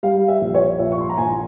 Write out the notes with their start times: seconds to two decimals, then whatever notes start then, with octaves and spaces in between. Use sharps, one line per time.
0.03 G3 F5
0.28 E5
0.41 A#1
0.54 C#5
0.79 A#2 E5
0.92 C#6
1.01 C6
1.09 A#5
1.17 A#1 G#5